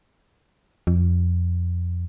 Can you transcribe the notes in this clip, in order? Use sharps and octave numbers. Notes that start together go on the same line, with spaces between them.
F2